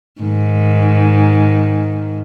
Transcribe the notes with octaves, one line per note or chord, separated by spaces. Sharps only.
G#2 D#3